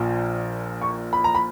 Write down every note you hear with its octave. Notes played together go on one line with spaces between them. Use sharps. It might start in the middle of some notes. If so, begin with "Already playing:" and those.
Already playing: A#1 A#2 F3 A#3
C#6
B5
A#5
B5